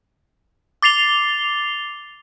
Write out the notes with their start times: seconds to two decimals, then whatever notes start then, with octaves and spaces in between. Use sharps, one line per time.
0.82 D6 A6 C7 F7 G7